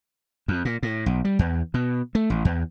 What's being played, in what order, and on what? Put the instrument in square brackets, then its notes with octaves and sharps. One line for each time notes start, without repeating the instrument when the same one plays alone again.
[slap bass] F2
A#2
A2
B1
G3
E2
B2
A3
A1
E2